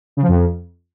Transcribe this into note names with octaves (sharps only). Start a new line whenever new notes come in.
C#3
F3
F2